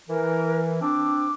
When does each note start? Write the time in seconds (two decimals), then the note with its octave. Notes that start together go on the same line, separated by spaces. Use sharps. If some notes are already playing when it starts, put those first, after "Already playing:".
0.09 E3 A#4
0.81 C4 D4 D6